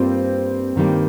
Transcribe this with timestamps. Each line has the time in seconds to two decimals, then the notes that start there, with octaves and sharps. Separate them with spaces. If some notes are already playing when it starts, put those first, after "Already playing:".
Already playing: G2 G3 A#3 C4 F4
0.76 G2 D#3 G3 A#3